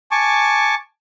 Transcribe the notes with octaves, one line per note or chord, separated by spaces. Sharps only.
G#5 A5 C#6 D6